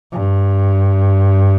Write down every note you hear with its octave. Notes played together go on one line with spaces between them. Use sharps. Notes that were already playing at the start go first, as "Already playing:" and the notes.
G2